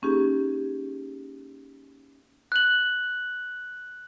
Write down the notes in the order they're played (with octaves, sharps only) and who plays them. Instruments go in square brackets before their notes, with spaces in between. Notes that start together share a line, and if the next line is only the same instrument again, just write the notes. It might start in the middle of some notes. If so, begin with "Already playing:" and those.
[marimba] A#3 C#4 D#4 G4 G#4
[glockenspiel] F#6 F#7